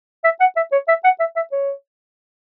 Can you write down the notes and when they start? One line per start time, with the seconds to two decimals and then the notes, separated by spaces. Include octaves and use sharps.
0.24 E5
0.40 F#5
0.56 E5
0.72 C#5
0.88 E5
1.04 F#5
1.20 E5
1.36 E5
1.52 C#5